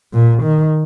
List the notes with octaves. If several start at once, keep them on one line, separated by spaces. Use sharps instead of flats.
A#2
D#3